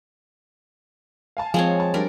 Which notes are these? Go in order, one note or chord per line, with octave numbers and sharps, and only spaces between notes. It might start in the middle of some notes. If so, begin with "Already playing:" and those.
F5 G#5 A5
F3 G#3 C4 C#5
A5
G3 D4 A#4 D5